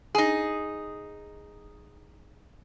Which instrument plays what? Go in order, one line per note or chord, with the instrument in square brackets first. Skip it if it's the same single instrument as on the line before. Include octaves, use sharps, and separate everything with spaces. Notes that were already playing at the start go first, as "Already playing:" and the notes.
[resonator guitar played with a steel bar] D#4 G#4